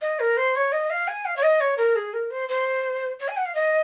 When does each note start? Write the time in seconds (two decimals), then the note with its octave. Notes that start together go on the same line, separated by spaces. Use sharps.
0.01 D#5
0.20 A#4
0.37 C5
0.55 C#5
0.72 D#5
0.90 F5
1.08 G#5
1.25 F5
1.36 C#5
1.43 D#5
1.60 C#5
1.78 A#4
1.96 G#4
2.13 A#4
2.31 C5
2.48 C5
3.19 C#5
3.28 G#5
3.37 F#5
3.45 F5
3.55 D#5